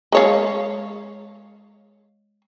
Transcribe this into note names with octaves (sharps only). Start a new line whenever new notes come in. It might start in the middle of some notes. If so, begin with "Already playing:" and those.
G#3 C#5 F5